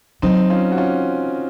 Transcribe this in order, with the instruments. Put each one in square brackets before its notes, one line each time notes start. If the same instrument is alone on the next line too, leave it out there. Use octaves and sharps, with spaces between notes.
[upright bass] F#3 [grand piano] C4 D#4
[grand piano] C#4 F4
F#4
C#4 F4